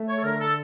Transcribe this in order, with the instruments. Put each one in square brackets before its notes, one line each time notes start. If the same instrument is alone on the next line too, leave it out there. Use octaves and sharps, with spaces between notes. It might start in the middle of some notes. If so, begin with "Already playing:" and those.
Already playing: [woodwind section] A3
C#5
A4
D3 A#4
A4